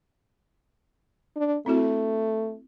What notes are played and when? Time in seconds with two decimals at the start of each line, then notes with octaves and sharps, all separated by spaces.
1.36 D4
1.66 A3 C4 E4 F#4